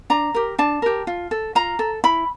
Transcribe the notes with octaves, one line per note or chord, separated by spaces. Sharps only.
D4 A#5
G4 A#4
D4 A5
G4 A#4
F4
A4
F4 A#5
A4
E4 B5